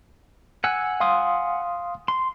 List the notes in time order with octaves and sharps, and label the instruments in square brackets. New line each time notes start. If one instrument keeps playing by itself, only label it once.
[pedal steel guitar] F#5 G#5 E6
[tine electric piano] F5 C6 D#6
[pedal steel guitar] C6